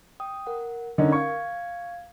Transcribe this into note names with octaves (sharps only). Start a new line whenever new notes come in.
G5 D#6
A#4 F#5
D3 C#4 D#4 A#4
F5 C#6 G#6